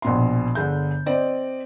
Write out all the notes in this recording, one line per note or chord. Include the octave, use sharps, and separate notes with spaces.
A#1 B2 C6
G1 D3 G#4 G6
C4 D5 D#5